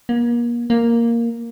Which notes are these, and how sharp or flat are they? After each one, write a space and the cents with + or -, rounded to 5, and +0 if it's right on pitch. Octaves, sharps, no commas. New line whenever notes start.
A#3 +35
A#3 +0